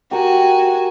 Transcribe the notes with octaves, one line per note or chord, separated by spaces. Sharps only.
F#4 G4 A#4 G#5